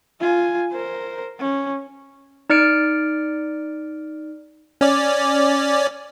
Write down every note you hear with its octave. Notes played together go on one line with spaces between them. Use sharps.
F4 G#5
A#4 C5
C#4
D#4 D5 F6 C#7 D7
C#4 D5